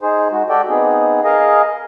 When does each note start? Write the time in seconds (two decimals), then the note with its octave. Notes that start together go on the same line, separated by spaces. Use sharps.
0.01 D#4 G#4 C5
0.32 G#3 D#4 F#4
0.49 F#4 G4 A4 D5 G5
0.69 B3 C4 D#4 G#4
1.24 G#4 A#4 D#5 F5